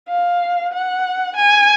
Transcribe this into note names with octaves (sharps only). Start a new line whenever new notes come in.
F5
F#5
G#5